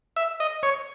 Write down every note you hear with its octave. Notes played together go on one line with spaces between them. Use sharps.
E5
D#5
C#5